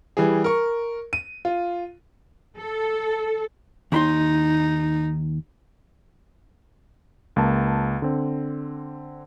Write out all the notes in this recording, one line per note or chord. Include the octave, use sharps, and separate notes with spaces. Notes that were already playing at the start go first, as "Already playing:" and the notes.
E3 G3 G#4
A#4 C#6
D#7
F4
A4
D#2 D#4 B5 C6
C#2 A#3 A5
D3 C4